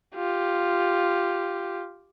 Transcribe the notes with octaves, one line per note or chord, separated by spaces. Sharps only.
F4 G4